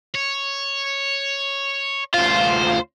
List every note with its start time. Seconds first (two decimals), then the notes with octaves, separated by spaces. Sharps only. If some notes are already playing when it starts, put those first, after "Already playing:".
0.15 C#5
2.14 D2 F4 C5